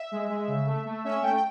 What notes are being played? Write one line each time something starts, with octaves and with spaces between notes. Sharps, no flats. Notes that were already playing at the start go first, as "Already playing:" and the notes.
Already playing: E5
G#3
G#3
C#3
A3
A3
C#4 E5
A3 G5
G5